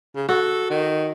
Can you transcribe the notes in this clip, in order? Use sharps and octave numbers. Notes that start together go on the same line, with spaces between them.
C#3
F#4 A4
D#3